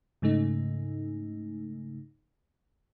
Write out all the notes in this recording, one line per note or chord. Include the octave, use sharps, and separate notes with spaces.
G#2 C#3 A3 D#4